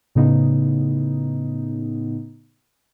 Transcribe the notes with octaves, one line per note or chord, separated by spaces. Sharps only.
A2 C#3 B3 D#4